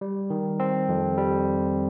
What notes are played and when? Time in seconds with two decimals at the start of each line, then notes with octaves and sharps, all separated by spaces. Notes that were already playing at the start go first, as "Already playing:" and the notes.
0.01 G3
0.30 D#3
0.60 C4
0.89 F2
1.18 G3